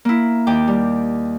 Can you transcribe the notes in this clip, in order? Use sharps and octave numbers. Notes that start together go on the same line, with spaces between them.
A#3 E4
D#2 G5 D6
G3